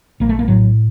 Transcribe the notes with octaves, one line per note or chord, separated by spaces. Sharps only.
A#1 A#3
A3
A#3
A2 F#3